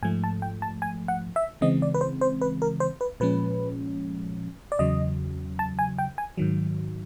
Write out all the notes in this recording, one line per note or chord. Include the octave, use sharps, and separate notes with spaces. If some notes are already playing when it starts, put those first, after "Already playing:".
G#2 F3 A3 G#5
A5
G5
A5
G#5
F#5
E5
C#3 E3 G#3 C4 D#5
D5
B4
C5
C5
B4
A#4
C5
B4
A#2 F3 G#3 C#4 B4
D5
E2 C#3 F#3 D#5
A5
G#5
G5
G#5
G#2 D#3 F#3